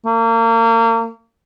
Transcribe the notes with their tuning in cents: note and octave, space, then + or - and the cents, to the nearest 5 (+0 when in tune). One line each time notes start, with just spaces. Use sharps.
A#3 -35